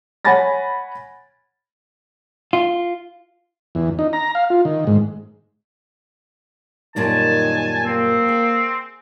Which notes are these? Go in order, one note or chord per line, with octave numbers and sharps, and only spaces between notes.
C#5 F#5 G#5 B5 A6 A#6
F4
E2
D#4
A#5
F5
F4
D#3
G#2
F#2 A#2 D#3 G3 G#5 A5
A#3 C4
G#4